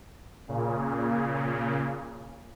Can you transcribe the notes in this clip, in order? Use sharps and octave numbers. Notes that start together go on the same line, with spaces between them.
A#2 C#3